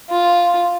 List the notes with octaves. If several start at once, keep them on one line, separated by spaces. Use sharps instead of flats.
F4